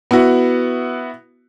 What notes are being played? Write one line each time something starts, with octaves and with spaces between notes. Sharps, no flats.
B3 E4 F#4